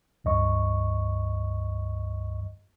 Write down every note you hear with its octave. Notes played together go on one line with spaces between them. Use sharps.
C#2 G2 D#5 C#6